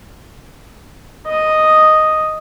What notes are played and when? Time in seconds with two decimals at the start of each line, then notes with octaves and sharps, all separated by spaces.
1.27 D#5 D#6